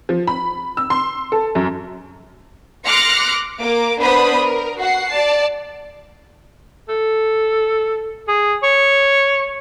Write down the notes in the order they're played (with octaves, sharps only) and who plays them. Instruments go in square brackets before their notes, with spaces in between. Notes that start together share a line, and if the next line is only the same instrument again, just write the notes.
[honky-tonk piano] F3
B5
E6
C6
A4
F#2
[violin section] C6 D6 F6 F#6 A#6 C#7
A#3 A#4 D6
B3 D4 B4 C5 B5 D#6
A#4
F#4 F#5 C7
D5 A5
[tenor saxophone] A4
G#4
C#5